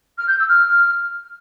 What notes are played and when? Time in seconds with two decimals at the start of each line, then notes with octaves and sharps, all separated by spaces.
0.17 F6
0.28 G6
0.38 E6
0.49 F6